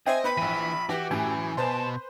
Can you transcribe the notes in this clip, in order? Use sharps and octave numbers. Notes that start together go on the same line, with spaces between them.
C4 C5 D#5 E5 G5 G#5
B3 B5
A#1 E3 B6 D#7
E3 F#4 G4
F#2 A2 E3 G#5
B2 B4 C5 A5 C6